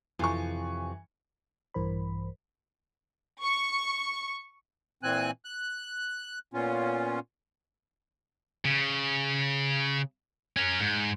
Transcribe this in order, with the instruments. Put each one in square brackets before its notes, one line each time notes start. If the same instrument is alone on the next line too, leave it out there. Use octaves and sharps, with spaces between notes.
[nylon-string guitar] F2 C3 F4 [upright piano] E3 G#5 C#6
[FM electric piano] A#1 G2 E3 A#4 C5 B5
[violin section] C#6
[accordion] A#2 E3 C4 G#5 F#6
F#6
A#2 B3 C#4 F4
[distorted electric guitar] C#3
C#4 A#4
G#2